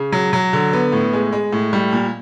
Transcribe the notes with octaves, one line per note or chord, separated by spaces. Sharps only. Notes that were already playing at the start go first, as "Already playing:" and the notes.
Already playing: C#3
F#3
F#3
D3
B3
A2
G#3
G#3
A2
G3
A#2